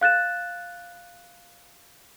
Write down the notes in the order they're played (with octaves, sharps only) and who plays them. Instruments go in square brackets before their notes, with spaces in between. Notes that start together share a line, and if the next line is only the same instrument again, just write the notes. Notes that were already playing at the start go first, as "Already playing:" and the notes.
[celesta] F5 F#6 A6 E7